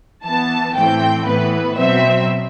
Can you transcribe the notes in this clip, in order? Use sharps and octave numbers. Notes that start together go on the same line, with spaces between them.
E3 B3 A5
A2 E3 A3 C4 G5
A2 E3 B3 B4
B2 F#3 C4 E5